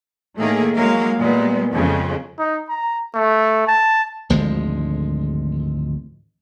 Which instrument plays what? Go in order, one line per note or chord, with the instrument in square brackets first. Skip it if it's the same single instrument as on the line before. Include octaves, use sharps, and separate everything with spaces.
[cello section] A2 D#3 A3 A#3 G#4
F#3 G#3 A#3 A#4 F5
A#2 G3 G#3 B3
F2 C#3 G#3
[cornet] D#4
A#5
A3
A5
[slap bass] G#1 D2 F3 G#3